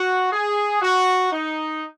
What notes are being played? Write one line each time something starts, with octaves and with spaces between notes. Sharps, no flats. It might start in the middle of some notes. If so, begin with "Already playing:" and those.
Already playing: F#4
G#4
F#4
D#4